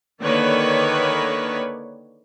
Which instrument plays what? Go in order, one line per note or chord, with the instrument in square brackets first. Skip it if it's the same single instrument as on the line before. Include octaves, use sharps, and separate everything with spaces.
[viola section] D3 D#3 A#3 B4 C#5 D5